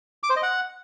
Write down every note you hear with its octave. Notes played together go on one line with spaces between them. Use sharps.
D6
C5
D#5
F#5